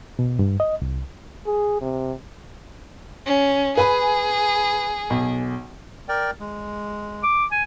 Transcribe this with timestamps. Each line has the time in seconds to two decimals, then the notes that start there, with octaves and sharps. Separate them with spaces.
0.19 B2
0.39 G2
0.60 D#5
0.82 C2
1.47 G#4
1.82 C3
3.27 C#4
3.78 G#4 B4 G#5 B5
5.10 B1
6.09 A#4 D5 G5
6.40 G#3
7.23 D6
7.52 G#5